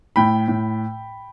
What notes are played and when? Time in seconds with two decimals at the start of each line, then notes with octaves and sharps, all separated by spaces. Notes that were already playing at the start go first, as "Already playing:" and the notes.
0.16 A2 G5 B5
0.48 A2